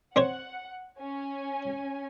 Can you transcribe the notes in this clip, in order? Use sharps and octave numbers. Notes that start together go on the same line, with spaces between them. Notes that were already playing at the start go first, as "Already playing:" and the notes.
C4 C5 C#5 F#5
C#4 G#5